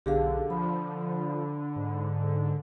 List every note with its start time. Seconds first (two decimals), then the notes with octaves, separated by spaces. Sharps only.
0.06 B1 D3 G4 G#4 F5
0.50 F3 B5
1.76 G#2